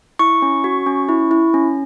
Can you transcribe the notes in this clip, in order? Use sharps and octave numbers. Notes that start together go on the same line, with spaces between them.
E4 C#6
C#4
F#4
C#4
E4
E4
C#4